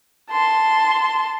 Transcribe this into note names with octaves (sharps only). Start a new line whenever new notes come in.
A5 C6